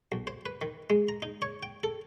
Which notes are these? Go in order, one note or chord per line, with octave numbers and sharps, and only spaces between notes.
B1
C5
B4
D#3
G#3
A#5
D#4
C#5
G5
A4